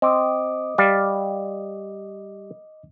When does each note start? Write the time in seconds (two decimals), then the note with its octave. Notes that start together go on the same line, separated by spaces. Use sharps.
0.02 C4 D#5 D6 D#6
0.78 G3 D5 F5